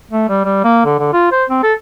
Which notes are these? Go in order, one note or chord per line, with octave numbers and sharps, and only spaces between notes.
A3
G3
G3
A#3
D3
D3
F4
C5
C4
A4